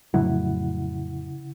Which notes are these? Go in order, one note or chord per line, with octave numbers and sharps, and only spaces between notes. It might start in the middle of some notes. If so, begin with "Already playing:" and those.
F2 A2 C#3 F#3 E4 F#5